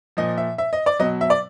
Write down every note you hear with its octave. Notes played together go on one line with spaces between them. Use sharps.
A#2 F3 D#5
E5
E5
D#5
D5
B2 F#3 D#5
E5
D5